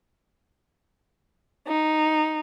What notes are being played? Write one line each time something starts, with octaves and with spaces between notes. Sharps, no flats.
D#4